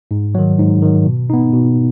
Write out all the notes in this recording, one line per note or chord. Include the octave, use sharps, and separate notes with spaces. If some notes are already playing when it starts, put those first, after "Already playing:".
G#2
D#3 F#3
G#2
D#3 F#3
B2
B3 D#4
B2